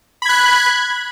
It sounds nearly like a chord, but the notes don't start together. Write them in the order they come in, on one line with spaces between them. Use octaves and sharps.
B5 G#6 F#6